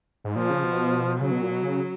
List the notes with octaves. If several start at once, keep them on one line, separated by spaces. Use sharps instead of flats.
G#2
A#2 F3
C#3
B2
C#3 F#3
B2
A#2
B2
C#3